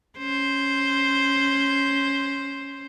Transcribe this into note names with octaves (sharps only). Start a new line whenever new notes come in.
C#4 C5